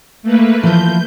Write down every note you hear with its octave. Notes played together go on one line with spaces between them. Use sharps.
A3 A#3 B4
E3 F3 G6